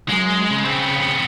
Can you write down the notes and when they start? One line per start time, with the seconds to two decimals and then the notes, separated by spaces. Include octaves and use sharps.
0.09 F#2 G#3
0.50 C#3
0.65 B3 C4